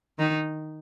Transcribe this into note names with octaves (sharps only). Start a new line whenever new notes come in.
D#3 D#4